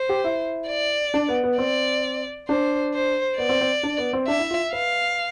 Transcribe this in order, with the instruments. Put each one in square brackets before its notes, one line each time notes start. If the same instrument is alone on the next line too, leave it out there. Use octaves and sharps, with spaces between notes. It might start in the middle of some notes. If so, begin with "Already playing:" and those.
Already playing: [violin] C5
[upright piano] G4
E4
[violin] D5
[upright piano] D4
B3
B3
[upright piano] C4 [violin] D5
[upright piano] D4 [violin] C5
[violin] C5
[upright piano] B3 [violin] D5
[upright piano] C4
C4
D4
B3
C4
[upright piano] D4 [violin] E5
[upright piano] E4
F4
[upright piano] B4 [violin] F5